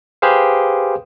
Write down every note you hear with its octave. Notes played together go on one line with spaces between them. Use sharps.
G4 G#4 B4 C5 F5